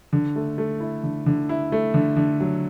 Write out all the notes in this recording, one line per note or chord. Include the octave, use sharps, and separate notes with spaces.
D3
A3
A3
E4
D3
D3
E4
A3
D3
D3
F#3